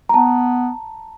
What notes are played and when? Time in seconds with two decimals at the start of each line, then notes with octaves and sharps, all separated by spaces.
0.09 A#5
0.14 B3 A5